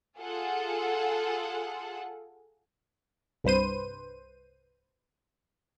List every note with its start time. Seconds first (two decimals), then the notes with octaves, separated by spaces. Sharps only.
0.18 F4 G#4 A4 F#5
3.44 C2 G2 B4 C5 D#7